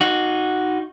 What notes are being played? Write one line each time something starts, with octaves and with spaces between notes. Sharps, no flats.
D#4 F#4